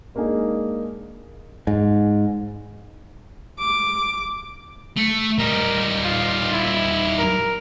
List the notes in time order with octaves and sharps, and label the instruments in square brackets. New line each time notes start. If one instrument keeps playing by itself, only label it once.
[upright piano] G#3 A#3 D4 D#4 G#4
[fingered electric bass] G#2
[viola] D6
[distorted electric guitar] A3
[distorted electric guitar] G3 D#4 [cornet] A#4
[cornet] F4
E4
A#4